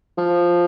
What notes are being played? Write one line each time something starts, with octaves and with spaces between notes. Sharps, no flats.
F3